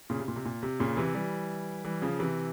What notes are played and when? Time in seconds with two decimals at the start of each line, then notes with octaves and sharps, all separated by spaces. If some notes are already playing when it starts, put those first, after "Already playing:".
0.10 A#2 C#3
0.19 C3
0.28 A#2
0.36 C3
0.45 A#2
0.63 C3
0.80 A#2 C#3
0.97 C3 E3
1.14 E3 G3
1.85 E3 G3
2.02 C#3 F3
2.19 C3 E3